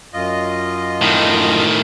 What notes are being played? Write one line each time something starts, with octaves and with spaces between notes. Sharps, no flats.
F#2 F4 D#5
A2 D#3